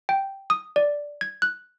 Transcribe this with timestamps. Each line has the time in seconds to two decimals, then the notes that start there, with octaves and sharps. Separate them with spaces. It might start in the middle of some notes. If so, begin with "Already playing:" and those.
0.09 G5
0.50 D#6
0.76 D5
1.21 G#6
1.42 F#6